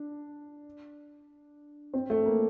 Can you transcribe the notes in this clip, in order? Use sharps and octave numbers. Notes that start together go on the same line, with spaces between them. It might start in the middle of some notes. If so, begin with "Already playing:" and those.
Already playing: D4
C4
A3
A#3